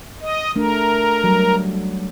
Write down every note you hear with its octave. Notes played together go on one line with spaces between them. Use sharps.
D#5
A3 D4 A#4
F#3 G3